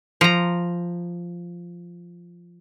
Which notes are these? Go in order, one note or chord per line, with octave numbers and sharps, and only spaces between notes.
F3 A#5